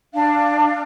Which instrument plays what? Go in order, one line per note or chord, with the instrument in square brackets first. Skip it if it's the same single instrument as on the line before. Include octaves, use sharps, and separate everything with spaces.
[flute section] D4 F5